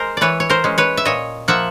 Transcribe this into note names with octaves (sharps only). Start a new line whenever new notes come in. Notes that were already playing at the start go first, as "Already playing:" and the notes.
Already playing: G#3 A#4 C5
E3 B4 C#5 D5
C#5
A#4 C5
G#3 C#4
B4 C#5
E5
A#2 C#5 D#5
F3 A#3 E5 F#5